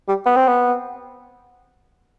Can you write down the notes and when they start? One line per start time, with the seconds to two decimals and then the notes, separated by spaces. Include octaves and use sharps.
0.08 G3
0.25 B3
0.36 C4
0.47 B3